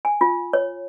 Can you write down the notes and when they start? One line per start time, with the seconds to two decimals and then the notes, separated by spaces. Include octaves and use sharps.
0.05 G#5
0.21 F4
0.53 C#5